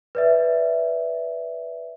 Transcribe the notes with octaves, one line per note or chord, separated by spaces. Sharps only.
B4 D5 E5